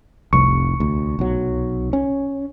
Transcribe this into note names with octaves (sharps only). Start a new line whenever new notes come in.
F1 C2 C#6
D2
B1 F#3
C#4